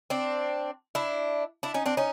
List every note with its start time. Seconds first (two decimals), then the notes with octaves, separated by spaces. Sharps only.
0.10 C4 D4
0.95 D4 E4
1.63 D4 E4
1.74 C#4 D#4
1.86 C4 D4
1.97 C#4 D#4